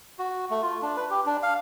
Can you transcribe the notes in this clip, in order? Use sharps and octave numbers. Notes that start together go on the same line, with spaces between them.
F#4
A3
F4
D4
B4
G4
D4
F5